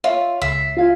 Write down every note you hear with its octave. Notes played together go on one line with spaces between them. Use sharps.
F4 C#5 E5
C#2 E5 C7
F4 F5 G#5